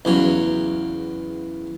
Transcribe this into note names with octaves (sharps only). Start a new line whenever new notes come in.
E2 C#3 F#3